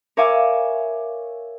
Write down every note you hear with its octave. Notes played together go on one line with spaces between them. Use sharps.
A#4 C#5 E5 F5 G#5 D6